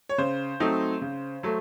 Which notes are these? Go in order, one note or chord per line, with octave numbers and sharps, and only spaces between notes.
C#5
C#3 C5
F#3 A3 C4 D#4
C#3
F#3 A3